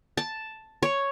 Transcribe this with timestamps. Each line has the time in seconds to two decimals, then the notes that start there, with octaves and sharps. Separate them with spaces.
0.17 A5
0.83 C#5